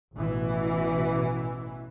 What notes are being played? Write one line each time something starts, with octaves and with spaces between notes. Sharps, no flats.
A1 B2 E3